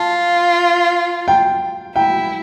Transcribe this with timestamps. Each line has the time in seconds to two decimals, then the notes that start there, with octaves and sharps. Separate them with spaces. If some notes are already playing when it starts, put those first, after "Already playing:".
Already playing: F4 A5
1.28 G5
1.96 E4 G5